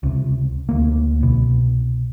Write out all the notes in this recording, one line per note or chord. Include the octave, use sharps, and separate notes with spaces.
C#2 C3
D2 A#3
C2 B2